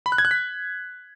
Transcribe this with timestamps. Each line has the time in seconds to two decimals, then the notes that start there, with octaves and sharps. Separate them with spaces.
0.06 B5
0.12 F#6
0.18 G#6
0.25 F#6
0.31 B6